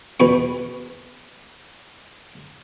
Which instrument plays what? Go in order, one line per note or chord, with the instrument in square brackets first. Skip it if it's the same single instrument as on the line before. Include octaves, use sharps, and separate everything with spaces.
[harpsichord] E2 B2 C#6